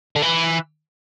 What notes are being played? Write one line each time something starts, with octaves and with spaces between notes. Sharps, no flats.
D3
E3